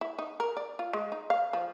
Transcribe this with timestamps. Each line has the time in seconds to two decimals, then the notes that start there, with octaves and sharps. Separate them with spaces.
0.01 E4
0.19 D#4
0.40 A#4
0.57 D5
0.79 F4
0.93 G#3
1.12 D#4
1.30 F5
1.53 F3